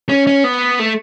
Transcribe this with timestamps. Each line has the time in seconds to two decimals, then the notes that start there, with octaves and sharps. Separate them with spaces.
0.09 C#4
0.27 C#4
0.44 B3
0.79 A3